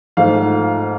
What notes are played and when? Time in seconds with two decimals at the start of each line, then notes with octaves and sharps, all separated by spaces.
0.17 G#2 F3 A3 F5